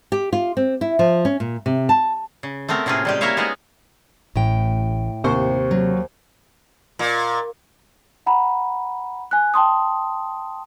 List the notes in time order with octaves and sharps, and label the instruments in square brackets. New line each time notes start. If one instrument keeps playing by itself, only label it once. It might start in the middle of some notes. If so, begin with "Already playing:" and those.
[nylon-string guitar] G4
F4
C4
E4
F3
C#4
A#2
C3
A5
[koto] C#3
A3 B3 C4 A#4
A2 C3 A#3 C#4 F4 G#4
G3 G#3 G4
A#3 E4 A#4 C#5 E5 F5
G#3 B3 D#4 F#4 F5
[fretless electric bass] A1 [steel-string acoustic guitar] A2 G5
[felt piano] D#2 C#6 [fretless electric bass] C3 [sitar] C5
[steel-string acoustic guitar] F#3
[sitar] A#2
[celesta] F#5 A#5 B5
G#5 F#6
G5 A5 C6 D#6